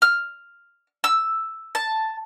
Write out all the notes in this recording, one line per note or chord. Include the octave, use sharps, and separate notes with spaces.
F6
E6
A5